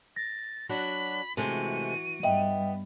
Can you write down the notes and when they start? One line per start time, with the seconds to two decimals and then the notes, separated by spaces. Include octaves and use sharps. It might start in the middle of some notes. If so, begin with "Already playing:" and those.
0.16 A6 A#6
0.69 F#3 D4 F#4 B5
1.37 C3 E3 G#3 A3 F#4 D#7
2.23 G2 G3 B3 D#5 E5 G5